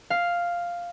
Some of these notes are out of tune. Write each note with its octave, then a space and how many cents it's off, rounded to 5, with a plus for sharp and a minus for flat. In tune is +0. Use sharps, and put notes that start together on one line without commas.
F5 +0